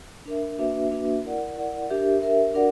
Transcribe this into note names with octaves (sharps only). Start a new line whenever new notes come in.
D4 A#4 E5
A#3 D4 F#4 B4 E5
A#3 D4 F#4 B4 E5
E4 A#4 D5 F#5
E4 A#4 D5 F#5
D4 G4 A#4 E5
D4 G4 A#4 E5
D4 F#4 A#4 D5 F#5